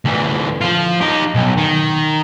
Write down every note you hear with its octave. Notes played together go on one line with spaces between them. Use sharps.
D2 E3
F3 F4
D#4 G4
B1
D#3